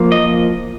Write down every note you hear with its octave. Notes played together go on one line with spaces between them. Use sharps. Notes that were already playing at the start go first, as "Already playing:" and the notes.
Already playing: F3 A#3
D#5